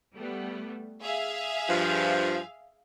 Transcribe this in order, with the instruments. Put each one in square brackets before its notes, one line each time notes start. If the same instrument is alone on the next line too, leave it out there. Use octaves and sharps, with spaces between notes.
[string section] G3 A3 B3
G#4 E5 F5
[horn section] G2 F3